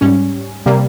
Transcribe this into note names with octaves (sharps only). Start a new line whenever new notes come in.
G#2 G3 C#4
C3 G3 A#3